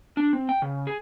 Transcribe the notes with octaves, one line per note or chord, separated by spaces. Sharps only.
D4
C4
G5
C#3
G#4